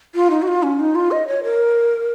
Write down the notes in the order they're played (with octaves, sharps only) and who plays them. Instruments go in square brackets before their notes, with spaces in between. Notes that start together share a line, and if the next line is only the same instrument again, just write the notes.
[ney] F4
D#4
F#4
F4
C#4
D#4
F4
D#5
C#5
A#4